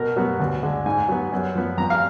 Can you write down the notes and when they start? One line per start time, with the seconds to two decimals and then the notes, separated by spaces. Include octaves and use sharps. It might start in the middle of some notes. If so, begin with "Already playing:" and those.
Already playing: B2 A#4
0.16 F#3 B3
0.40 D2
0.63 D3 G#3
0.86 G#2 G#5
1.09 F#3 B3
1.32 F#2
1.55 F3 B3
1.77 F2 A#5
1.90 F5